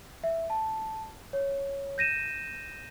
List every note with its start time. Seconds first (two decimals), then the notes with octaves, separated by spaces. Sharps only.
0.24 E5
0.50 A5
1.33 C#5
1.98 G6 A#6 D#7 E7